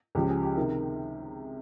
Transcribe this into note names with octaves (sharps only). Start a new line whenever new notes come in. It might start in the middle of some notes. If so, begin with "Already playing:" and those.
C#2 C#3 F3 G4
G#4
G4
C3 D#3 A#4